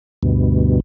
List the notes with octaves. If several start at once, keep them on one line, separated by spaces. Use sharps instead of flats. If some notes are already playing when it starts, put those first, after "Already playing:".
D2 G2 B2